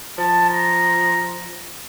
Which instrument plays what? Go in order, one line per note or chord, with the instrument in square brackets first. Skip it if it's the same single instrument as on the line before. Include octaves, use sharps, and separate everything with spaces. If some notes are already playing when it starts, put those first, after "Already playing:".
[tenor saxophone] F3 [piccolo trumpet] A5
[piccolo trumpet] A#5